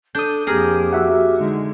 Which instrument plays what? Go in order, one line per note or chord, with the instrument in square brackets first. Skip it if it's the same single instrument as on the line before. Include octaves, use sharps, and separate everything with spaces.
[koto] D4 [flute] A4 [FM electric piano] D#6 G6
[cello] F2 A#3 [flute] G4 [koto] G#4 A#4
[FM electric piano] F#4 E5 F#5
[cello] D3 G#3 [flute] D#4